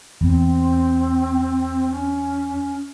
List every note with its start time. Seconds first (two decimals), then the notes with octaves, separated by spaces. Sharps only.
0.21 E2 C4
1.90 C#4